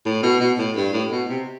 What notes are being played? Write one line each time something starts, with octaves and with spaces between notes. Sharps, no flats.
A2
B2
B2
A2
G2
A2
B2
C3